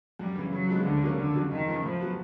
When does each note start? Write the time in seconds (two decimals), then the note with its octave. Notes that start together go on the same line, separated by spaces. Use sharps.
0.19 F#2 G3
0.36 C#3 E3
0.51 C#3 F#3
0.69 F3 G#3 B3
0.85 D2 D3
1.02 C#3 F#3 A#3 C#4
1.17 F2 D3
1.35 C#3 F#3
1.51 F2 D#3
1.68 C#3 F3
1.83 A2 F3
2.01 F#3 B3